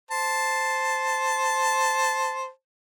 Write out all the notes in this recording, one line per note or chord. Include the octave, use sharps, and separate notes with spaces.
C5 A5